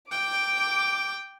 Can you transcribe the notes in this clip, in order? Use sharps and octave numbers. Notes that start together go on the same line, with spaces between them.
G5 D6